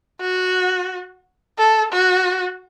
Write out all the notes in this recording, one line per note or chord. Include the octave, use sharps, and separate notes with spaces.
F#4
A4
F#4